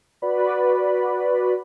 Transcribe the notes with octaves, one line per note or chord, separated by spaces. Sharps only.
F#4 B4 D5 B5